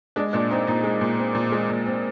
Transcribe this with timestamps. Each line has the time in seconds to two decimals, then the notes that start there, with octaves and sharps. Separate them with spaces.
0.16 G#3 D4
0.33 A#2 D4
0.51 C4 D#4
0.67 A#2 D#4
0.84 G#3
1.01 A#2
1.19 C4
1.35 A#2
1.52 G#3
1.70 A#2
1.86 C4